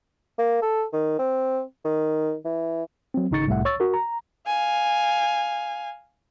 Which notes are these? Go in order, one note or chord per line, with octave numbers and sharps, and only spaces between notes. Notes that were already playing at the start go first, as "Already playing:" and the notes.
A#3
A4
D#3
C4
D#3
E3
F#3 C4
G#1 C#3 D#4 C#6 A6 C#7
C2 A2 A3 E5 F#5
C#5 C#6 E6 A6
F#4 A#4
A#5
F5 G#5